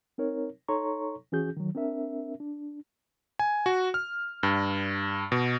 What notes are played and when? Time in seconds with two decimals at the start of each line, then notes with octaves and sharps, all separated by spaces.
0.18 C4 D#4 A#4 C#5
0.68 D#4 A4 C#5 A#5 C6 C#6
1.32 E3 C#4 F#4 G#4 G6
1.57 D#3 F#3
1.75 C4 D4 A#4 E5
2.40 D4
3.39 G#5
3.66 F#4
3.94 F6
4.43 G2
5.32 B2